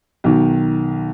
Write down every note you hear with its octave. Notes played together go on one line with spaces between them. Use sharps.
B1 D#3